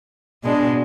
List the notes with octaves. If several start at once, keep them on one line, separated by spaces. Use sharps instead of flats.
B2 G#3 D4